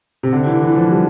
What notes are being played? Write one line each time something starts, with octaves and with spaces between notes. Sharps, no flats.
C3
D3
E3
E3
F3
G3